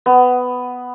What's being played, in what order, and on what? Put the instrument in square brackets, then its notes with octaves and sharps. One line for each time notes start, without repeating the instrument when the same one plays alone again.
[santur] B3